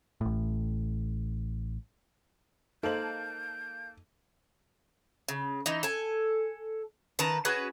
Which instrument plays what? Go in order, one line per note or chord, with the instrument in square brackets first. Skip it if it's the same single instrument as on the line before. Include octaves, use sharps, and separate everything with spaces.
[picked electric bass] A1 A2
[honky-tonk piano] A#3 A5 F#7 [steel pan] D#4 C5 [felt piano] A4 [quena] G6
[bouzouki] C#3
E3 D#4
A4 G#5
D#3 B4 A5 A#5
C#4 F#4 G#4 B4